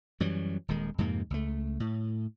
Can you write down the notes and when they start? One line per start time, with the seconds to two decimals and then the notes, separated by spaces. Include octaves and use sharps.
0.20 F#2 E3 F#3 G3
0.68 D#1 D#3 G#3
0.98 F2 G#2 C3 A#3
1.30 C#2 A3
1.80 A2